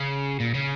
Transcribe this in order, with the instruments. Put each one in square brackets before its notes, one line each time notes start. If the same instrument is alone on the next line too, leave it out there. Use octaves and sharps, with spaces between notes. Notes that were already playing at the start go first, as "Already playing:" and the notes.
Already playing: [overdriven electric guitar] C#3
A#2
C#3